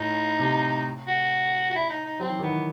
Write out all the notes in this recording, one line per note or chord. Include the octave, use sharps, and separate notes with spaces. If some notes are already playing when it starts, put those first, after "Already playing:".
Already playing: A2 D#4
C3
F#4
F#4
E4
D#4
D#4
F#3 C4
E3
D#3 B3
E3